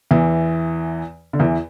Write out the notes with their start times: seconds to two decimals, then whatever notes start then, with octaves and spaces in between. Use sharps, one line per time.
0.11 E2 E3
1.33 D3
1.39 E2 E3